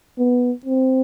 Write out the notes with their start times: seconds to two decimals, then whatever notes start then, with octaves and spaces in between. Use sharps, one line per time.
0.19 B3
0.65 C4